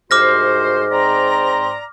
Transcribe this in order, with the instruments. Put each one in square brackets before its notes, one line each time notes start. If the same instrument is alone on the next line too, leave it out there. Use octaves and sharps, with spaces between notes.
[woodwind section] C2 F#4 C5 [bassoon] G#2 [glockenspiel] D6 F6 A#6
[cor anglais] C4 [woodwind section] D5 A#5